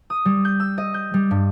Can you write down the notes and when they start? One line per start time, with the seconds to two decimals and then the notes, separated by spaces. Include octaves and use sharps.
0.10 D#6
0.25 G3
0.45 G6
0.60 E6
0.78 D#5
0.94 G6
1.14 G3
1.31 G2